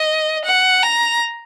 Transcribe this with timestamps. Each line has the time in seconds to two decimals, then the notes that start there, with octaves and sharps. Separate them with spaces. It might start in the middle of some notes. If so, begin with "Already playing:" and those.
Already playing: D#5
0.45 F#5
0.83 A#5